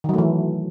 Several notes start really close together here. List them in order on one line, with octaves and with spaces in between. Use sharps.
D#3 F#3 A3 E3